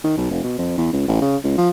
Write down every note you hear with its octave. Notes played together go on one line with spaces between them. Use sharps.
D#3
B1
F1
B2
F2
E2
C#2
A1
C#3
C#2
F3